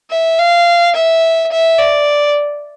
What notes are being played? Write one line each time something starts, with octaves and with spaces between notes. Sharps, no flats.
E5
F5
E5
E5
D5